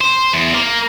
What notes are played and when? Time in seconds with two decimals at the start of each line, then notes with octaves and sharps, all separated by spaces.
0.01 C5
0.33 E2
0.54 A#3